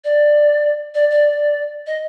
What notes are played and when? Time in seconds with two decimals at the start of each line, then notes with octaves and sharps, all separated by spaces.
0.04 D5
0.94 D5
1.10 D5
1.87 D#5